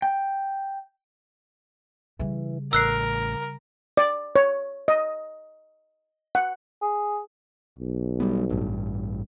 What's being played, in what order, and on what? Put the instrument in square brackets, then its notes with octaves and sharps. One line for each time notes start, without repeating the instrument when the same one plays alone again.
[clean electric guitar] G5
[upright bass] C#3 G3 [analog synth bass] E3
[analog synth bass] A1 [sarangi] A#4 [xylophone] E6 F#6 C7
[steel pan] D5
C#5
D#5
F#5
[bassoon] G#4
[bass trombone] B1
[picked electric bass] G3 B3
A1 G2